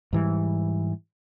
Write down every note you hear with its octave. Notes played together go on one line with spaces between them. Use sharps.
G#2 E3 G3